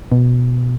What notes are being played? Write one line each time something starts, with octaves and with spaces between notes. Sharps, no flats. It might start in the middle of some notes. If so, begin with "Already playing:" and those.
B2